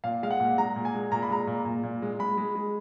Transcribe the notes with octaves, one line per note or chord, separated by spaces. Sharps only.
A#2 F5
G#3 F5
F#5
A#2
G#3 A#5
A#2
G#5
G#3
A#2 A#5
B5
G#3 A#5
A#2
A#2
A#2
G#3
G#3 B5
G#3
G#3